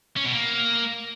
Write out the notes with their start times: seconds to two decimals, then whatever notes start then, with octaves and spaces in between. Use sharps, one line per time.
0.16 C#4
0.25 B2
0.33 A#3